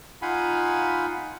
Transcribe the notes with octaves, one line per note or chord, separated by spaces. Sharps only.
D#4 F4 F5 F#5 G#5 B5